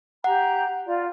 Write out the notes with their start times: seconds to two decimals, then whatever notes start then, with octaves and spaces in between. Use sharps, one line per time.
0.24 G4 F#5 A#5
0.86 F4 D5